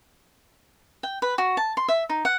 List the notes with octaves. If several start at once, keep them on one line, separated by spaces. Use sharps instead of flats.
G5
B4
F#4
A5
C6
E5
D#4
F#5